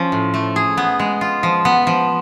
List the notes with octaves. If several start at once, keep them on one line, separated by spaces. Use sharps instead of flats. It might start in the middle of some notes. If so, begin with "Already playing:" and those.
Already playing: F3 C#4
A2
A3
G#4
B3
G#3
F4
F3
B3
F3